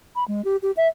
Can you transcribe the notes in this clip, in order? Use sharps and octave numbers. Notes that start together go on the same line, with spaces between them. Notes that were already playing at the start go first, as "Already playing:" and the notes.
B5
G#3
G4
G4
E5